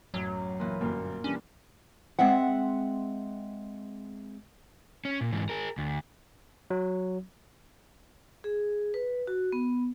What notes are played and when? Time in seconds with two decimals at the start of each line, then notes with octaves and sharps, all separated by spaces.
0.14 A1 F#2 F#3
0.60 A#2 E3
0.81 G1 F#2 A#3
1.24 E3 G3 C#4 D4
2.19 G#3 C4 E5 F#5
5.05 C#4
5.21 A#2
5.32 G#2 E3
5.49 G#4 A#4
5.78 D2
6.70 F#3
8.44 G#4
8.94 B4
9.27 F#4
9.52 B3